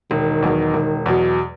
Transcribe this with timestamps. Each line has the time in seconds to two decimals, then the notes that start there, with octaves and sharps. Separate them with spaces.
0.11 E1 D#3
0.42 E2 B2 F#3
0.74 E1
1.06 E2 B2 F#3